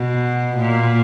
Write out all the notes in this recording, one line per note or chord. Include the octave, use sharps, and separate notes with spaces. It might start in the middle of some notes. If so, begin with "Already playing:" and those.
Already playing: B2
A#2